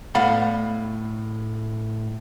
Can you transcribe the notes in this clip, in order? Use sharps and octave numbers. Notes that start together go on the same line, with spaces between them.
A2 B3 D5 F5 F#5 B5